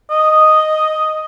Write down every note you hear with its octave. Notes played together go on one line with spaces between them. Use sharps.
D#5